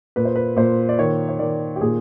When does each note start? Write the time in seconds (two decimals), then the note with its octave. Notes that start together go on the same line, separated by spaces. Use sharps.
0.16 A#2 B4
0.25 C5
0.36 B4
0.56 A#2 C5
0.89 D5
0.99 D#3 C#5
1.29 C#5
1.39 D#3 D5
1.76 G4
1.81 A#2 G#4